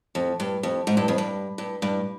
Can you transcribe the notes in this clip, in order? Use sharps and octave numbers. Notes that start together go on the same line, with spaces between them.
F2
G2
F2
G#2
G2
F2
G2
G2
G2